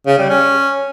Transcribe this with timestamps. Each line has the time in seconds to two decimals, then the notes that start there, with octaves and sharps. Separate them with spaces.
0.07 C#3
0.18 G3
0.30 C#4